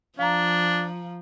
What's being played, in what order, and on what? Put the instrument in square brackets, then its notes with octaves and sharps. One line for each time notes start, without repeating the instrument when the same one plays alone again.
[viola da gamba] F3 [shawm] D4 [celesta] F5 A#5